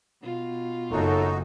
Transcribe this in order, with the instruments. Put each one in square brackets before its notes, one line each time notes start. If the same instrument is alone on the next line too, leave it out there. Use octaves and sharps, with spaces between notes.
[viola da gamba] B2 F4
[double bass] F#1 [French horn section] F#2 A4 [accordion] D#4 F#4